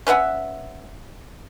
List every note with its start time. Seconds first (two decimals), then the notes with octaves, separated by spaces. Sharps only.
0.07 C#4 B4 E5 F#5